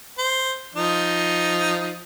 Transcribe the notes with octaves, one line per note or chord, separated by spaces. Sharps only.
C5
F3 D#4